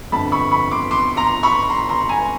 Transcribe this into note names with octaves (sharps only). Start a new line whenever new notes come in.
G1 F2 D3 A5 B5
B5 C#6
B5 C#6
C6 D6
C6 D6
A#5 C6
B5 C#6
A#5 C6
A#5 C6
G#5 A#5